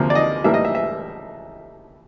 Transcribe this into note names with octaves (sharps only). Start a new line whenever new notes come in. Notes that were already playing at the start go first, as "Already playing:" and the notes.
Already playing: D2 C3 F3 A#3
D5
D#5
A2 E3 G3 A#3 E5
D#5
E5
E5